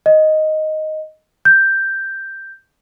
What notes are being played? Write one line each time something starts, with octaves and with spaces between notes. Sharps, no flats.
D#5
G6